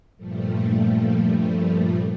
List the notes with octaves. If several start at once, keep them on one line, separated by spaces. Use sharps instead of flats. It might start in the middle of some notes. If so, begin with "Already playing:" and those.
G2 A#2 F3 G3 A3